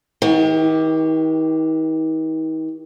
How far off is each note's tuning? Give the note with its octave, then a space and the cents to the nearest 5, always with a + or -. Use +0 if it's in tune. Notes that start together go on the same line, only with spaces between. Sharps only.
D#3 +40 G4 +0